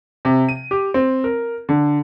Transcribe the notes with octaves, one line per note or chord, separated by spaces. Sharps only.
C3
D#7
G4
C4
A#4
D3